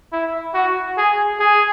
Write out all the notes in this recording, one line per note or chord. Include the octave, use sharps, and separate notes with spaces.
E4
F#4
G#4
G#4